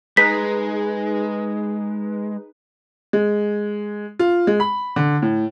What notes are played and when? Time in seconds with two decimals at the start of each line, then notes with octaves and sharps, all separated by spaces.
0.17 G#3 D#4 G#4 B4 B6
3.13 G#3
4.19 F4
4.47 G#3
4.60 B5
4.96 D3
5.22 A2